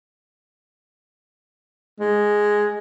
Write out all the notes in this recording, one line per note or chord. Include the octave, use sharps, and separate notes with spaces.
G#3